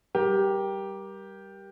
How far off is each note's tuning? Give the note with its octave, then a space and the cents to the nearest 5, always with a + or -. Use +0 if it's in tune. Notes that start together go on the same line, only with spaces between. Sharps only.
G3 +0 G4 +0 A#4 +20